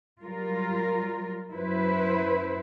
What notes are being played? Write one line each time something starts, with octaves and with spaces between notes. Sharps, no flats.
F#3 G3 F4 A#4
F#2 F#3 E4 B4 C5